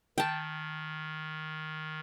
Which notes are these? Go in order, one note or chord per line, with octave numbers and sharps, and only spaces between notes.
D#3 G5 A5